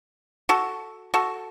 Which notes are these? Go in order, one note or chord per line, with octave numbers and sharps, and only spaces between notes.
F#4 A4
F#4 A4